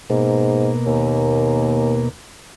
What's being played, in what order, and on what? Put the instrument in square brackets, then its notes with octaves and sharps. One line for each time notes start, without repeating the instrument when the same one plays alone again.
[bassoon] G#2 [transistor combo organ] B2 A#3
[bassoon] D#2